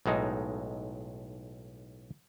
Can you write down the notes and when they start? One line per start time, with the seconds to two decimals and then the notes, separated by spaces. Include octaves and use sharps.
0.06 B1 A2 G#3 D#4